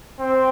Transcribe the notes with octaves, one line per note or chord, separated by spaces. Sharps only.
C4